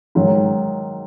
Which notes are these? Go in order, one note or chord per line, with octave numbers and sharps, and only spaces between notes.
G#2 D#3 F#3